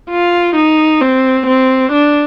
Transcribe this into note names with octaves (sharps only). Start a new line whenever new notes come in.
F4
D#4
C4
C4
D4